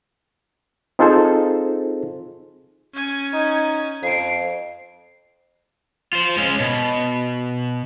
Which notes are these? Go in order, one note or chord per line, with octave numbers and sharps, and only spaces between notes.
C4 D#4 F4 G#4 A4 C5
C#4 G#5
D#4
F2 C7 D7
F4 C5
G#3 C#4
B2